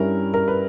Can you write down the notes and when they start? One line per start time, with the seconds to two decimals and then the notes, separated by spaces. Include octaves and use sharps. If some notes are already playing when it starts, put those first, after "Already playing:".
Already playing: G2 G3 C#4 E4 A#4
0.34 A#4
0.48 B4